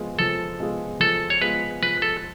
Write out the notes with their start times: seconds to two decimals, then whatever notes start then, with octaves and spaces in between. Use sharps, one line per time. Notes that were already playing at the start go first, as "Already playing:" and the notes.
Already playing: F3 G#3 B3 F4 G#4
0.19 F3 A4
0.60 G#3 B3 F4 G#4
1.00 F3 A4
1.30 C#5
1.42 G#3 B3 F4 G#4 B4
1.82 F3 B4
2.02 A4